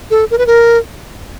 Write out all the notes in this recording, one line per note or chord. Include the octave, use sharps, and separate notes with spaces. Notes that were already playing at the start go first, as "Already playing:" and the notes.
A4
A#4
B4
A#4